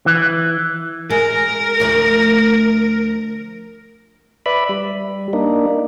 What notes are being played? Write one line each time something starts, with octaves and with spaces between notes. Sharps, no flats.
E3
G#3 A#4
D2 F3
B4 D5 E5 B5
G3
A#3 D4 D#4